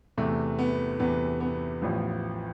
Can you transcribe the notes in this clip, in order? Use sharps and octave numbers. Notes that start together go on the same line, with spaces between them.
E2 C3 E3 A3
B3
E2 C3 E3 B3
B3
A1 A2 F3